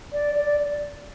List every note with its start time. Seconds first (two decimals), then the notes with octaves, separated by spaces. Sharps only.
0.13 D5
0.35 D5